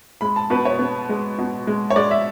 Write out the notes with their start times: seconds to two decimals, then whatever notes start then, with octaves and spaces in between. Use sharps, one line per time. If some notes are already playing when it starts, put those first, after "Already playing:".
0.21 G#3 B5
0.36 A5
0.50 B2 B4
0.65 C#5
0.79 B3
1.09 G#3
1.38 B2
1.67 G#3
1.90 C#5
1.96 G#3 D5
2.11 E5